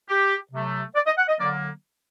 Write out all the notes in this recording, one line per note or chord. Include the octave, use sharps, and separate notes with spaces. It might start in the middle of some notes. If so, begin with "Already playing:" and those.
G4
C3 F#3 A3
D5
D#5
F#5
D#5
D3 F#3 A#3 D5